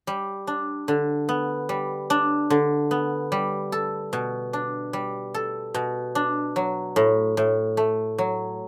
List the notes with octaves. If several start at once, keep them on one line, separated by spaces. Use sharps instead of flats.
G3
D4
D3
B3
G3
D4
D3
B3
G3
A4
B2
D4
G3
A4
B2
D4
F#3
A2
A2
A3
F#3